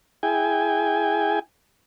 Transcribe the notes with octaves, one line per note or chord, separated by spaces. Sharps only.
E4 G#4 G5 G#5